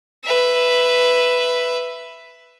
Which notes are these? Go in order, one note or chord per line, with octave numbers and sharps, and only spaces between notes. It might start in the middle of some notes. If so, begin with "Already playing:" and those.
B4 E5